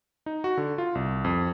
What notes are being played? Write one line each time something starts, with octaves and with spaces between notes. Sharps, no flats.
D#4
F#4
D3
F4
C2
F2